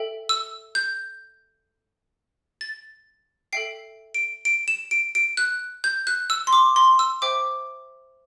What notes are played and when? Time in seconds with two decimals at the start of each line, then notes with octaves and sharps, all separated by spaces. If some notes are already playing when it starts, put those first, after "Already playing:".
Already playing: A4 E5 G5
0.29 E6
0.75 G6
2.61 A6
3.53 A4 E5 G5 C7
4.15 D7
4.45 D7
4.68 E7
4.91 D7
5.15 D7
5.37 F#6
5.84 G6
6.07 F#6
6.30 E6
6.47 C6
6.53 D6
6.76 C6
6.99 E6
7.22 C5 E5 G5 D6